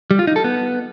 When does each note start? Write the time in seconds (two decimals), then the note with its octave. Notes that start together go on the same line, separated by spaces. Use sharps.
0.11 G3
0.19 F4
0.27 D#4
0.36 A4
0.44 B3